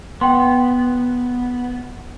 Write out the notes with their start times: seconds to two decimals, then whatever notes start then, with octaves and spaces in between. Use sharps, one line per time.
0.21 B3 G5 C6